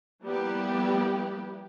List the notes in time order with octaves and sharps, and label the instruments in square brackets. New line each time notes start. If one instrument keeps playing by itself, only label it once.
[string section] F3 G3 A#3 B3 E4 G4